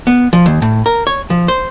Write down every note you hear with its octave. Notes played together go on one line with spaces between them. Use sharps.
B3
F3
D#2
A2
A#4
C#5
F3
C5